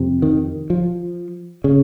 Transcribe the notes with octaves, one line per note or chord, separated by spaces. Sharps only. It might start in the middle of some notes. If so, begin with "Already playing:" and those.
Already playing: F2 C3
D#3
F3
C#3